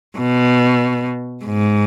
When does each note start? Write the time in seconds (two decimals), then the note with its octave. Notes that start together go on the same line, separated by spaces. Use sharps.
0.18 B2
1.44 G#2